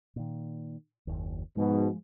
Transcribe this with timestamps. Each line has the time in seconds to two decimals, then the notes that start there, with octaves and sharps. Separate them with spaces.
0.16 A#2 D#3
1.07 F#1 D#2
1.57 G#2 B2 F3 G#3